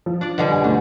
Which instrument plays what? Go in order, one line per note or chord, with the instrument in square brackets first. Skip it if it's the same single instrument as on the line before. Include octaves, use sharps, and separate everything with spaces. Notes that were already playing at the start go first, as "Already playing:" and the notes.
[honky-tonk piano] F3
[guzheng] D4 D5
B2 D3 G3
[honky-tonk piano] G#5
[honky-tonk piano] D2 A3 [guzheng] D4